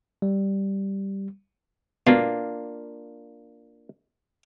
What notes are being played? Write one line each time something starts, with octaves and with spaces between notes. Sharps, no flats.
G3
B2 A#3 D4 F4